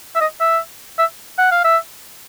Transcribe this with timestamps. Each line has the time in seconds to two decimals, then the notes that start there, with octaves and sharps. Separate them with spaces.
0.15 E5
0.21 D#5
0.40 E5
0.99 E5
1.38 F#5
1.51 F5
1.64 E5